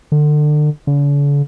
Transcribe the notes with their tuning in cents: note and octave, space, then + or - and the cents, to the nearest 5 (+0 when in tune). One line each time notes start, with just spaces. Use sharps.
D3 +30
D3 -45